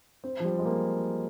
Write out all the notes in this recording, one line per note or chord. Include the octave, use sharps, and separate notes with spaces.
C4
F3
G3
G#3
A#3